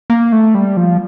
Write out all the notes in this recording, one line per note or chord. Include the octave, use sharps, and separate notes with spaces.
A#3
A3
G3
F3